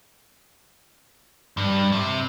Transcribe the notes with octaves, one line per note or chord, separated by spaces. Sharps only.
G2
C3